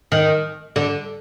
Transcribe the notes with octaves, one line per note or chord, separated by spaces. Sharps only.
D#3
D3